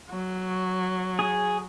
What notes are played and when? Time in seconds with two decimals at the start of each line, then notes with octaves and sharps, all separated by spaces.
0.10 F#3
1.19 G#4